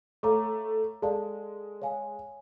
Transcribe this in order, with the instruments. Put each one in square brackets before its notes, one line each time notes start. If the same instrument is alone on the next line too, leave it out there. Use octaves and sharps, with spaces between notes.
[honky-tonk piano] A3 [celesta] C#5 F5 A#5 D6
[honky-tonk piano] G#3 [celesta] A4 D5 F5 A5
[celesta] C#5 F5 G#5